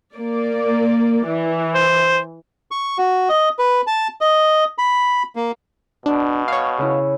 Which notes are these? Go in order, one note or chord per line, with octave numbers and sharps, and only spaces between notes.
A#3 D5
E3
C5
C#6
F#4
D#5
B4
A5
D#5
B5
A#3
B2 D4
C#5 F5
C#3 E4